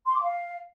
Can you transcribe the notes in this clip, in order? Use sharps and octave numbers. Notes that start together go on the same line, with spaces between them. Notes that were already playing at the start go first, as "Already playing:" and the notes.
C6
D6
F5